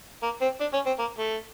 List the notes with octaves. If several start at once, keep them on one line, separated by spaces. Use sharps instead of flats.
A#3
C4
D4
C#4
C4
A#3
A3